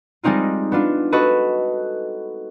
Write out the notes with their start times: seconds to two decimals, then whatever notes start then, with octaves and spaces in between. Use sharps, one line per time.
0.23 G3 G#3 C4 D#4 F4
0.72 B3 D4 F4
1.12 F#4 A4 B4 D#5